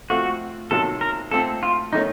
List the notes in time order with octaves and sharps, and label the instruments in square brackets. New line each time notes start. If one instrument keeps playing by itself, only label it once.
[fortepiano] F3 A3 C4 F4 A4 [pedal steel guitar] F#4
[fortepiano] C3 D#3 F#3 A#3 [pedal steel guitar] A4
[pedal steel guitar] A#4
[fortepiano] A#2 A3 C4 [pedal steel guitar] A4
[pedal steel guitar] F4
[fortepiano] D#3 A3 C#4 [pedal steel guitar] D#4